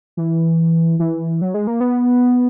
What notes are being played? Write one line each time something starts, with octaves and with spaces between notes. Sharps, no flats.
E3
E3
F#3
G#3
A#3
B3